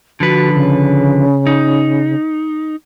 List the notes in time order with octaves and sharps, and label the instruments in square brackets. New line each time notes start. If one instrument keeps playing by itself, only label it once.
[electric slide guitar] D3 F3 B4 [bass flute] F#4
[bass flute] C#3
[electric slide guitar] D#4